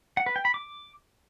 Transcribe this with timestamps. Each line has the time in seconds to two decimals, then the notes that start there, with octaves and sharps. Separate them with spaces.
0.17 F#5
0.26 B4
0.36 G5
0.45 B5
0.54 D6